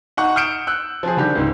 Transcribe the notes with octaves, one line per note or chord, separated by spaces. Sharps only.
D#4 F#5 C#6
D#6 F6 G6 C#7 D7 E7
E6 F#6
F3 C4 G#4
D3 D#3 G3 G4
C#2 G#2 C4